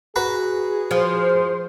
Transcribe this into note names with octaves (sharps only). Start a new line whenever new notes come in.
F#4 G#4 B4 A#5
F3 C5